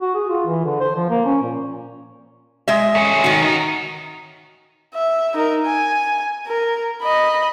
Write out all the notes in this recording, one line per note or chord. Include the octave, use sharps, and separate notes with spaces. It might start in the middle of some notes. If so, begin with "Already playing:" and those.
F#4
G#4
F4
E3
D3
C5
F3
A#3
C#4
A#2
G#3 D#5 E5
A3 C#4
D#3 F#4
D#4 A#4
E5
D#4 A#4
G#5
A#4
D#5 B5